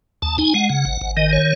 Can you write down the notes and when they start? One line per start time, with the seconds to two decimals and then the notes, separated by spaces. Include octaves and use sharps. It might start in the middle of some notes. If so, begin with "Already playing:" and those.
0.22 D#2 A5
0.38 D#4 G#5
0.54 G#3 F#5
0.69 C#3
0.86 G#1
1.01 G#1
1.17 D#3 D#5
1.33 C#5